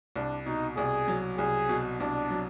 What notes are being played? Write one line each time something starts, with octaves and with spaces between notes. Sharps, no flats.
C2 D4
B2 D#4
C2 G#4
F#3
C2 G#4
B2
C2 D4
F#3